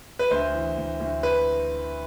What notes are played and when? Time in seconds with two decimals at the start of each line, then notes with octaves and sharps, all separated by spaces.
0.19 B4
0.31 D2 C5
0.54 E3
0.77 D2
1.00 D2
1.23 B4